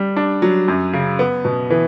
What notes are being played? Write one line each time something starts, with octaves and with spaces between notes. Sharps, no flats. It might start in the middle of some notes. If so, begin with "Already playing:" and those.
Already playing: G3
D4
F#3
F#2
C#3
B3
B2
E3